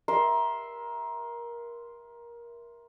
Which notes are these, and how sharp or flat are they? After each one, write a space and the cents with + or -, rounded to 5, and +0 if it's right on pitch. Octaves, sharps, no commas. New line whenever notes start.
A#4 +20 E5 +0 C6 +0